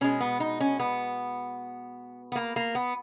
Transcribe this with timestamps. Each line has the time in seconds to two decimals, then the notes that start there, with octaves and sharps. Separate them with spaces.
0.01 B2 G#3 C#4
0.20 B3
0.40 D#4
0.61 C#4
0.79 B3
2.32 B3
2.36 A#3
2.56 A#3
2.75 B3